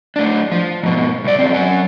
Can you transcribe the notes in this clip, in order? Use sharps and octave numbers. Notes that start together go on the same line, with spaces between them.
A2 D4
F3
G#2 B2
C2 D5
F#2 C4
F#3 C#4